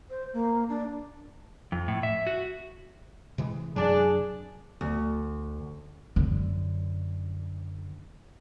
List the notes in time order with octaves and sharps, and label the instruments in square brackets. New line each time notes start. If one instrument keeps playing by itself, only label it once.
[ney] C5
A#3
D4
[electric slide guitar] F2
A2
E5
F#4
[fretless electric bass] C3 E3 G#3
[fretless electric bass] F#2 C3 F#3 [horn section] D4 [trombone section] G#4
[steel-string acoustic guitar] D2
[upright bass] F#2 D3